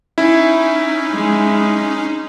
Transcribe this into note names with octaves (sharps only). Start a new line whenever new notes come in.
C#4 D#4 E4
G#3